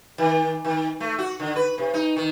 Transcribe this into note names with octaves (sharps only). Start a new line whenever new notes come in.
D#3
D#3
A3
F#4
D3
B4
C3
D#4
D#3